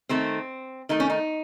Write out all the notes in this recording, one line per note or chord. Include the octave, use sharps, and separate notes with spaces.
D#3 A3 C4
D#3 A3 D#4
C#4
D#4